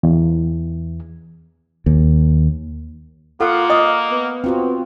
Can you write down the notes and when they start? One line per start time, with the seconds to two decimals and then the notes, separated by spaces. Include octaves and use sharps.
0.03 E2
1.86 D#2
3.41 A#3 F4 A4 F#5
3.70 D#5 D#6
4.12 B3
4.44 C4 F4 F#4